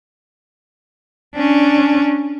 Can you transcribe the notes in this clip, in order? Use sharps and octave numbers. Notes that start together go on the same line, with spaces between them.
C#4 D4